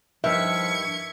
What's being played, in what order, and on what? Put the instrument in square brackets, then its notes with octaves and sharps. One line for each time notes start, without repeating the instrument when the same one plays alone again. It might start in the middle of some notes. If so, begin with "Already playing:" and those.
[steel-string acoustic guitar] G2 D#3 [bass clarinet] F3 [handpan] E5 [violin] C#6 G#6